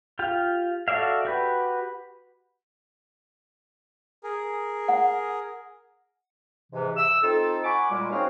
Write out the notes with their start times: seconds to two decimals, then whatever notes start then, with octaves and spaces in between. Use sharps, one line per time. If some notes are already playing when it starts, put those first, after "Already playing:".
0.19 F4 G4 F5
0.88 F#4 A4 D5 E5 F5
1.25 F#4 G4 B4
4.24 G#4 A#4
4.88 F#5
6.72 G#2 C3 E3
6.96 E6
7.23 C4 D#4 F4 A4
7.64 F#5 G#5 B5 C#6 D6
7.91 A#2 G3 G#3
8.11 C4 C#4 D#4 F#4 G#4 F5